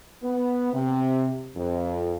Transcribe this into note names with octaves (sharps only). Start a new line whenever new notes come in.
B3
C3
F2